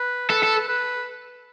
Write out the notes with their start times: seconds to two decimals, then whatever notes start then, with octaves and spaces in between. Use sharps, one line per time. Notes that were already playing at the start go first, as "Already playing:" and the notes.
Already playing: B4
0.30 A4 B4
0.43 A4
0.69 B4